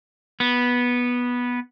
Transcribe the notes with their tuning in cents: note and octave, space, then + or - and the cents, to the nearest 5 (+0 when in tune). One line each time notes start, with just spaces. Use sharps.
B3 -10